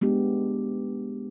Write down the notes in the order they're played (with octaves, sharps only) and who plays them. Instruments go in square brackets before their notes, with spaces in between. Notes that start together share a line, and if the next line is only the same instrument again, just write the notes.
[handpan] G#3 B3 D4 G4